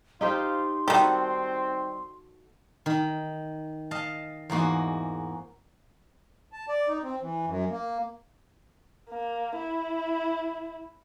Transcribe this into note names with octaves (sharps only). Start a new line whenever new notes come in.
D#4 F4 G4 C5 C6
D#3 G3 C4 F#4 A4
D#3
D#5 F5 A5
E2 G#2 A#3 F#4 D#5
A5
D5
D#4
C4
E3
F#2
A#3
A#3
E4